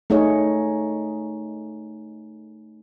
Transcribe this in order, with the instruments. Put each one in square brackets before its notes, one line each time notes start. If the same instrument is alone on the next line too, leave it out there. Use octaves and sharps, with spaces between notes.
[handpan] A3 D#4 G#4 C#5